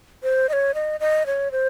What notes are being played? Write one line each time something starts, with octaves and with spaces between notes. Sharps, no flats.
C5
D#5
C#5
D#5
D#5
C#5
C5